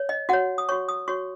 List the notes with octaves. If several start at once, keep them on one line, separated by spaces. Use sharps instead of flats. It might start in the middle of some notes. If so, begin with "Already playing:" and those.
Already playing: C#5
D#5
F#4 C#5 F#5
D#6
F#4 C#5 C#6
D#6
F#4 C#5 C#6